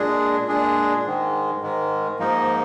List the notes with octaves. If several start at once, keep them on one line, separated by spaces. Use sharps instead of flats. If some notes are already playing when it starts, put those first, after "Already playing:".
Already playing: A#2 G#3 D4 G#4
A#2 G#3 D4 G#4
G#2 D#3 G#3
G#2 D#3 G#3
G#2 F3 A#3 D#4